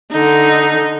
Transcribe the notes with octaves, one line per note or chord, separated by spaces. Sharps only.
D3 D#4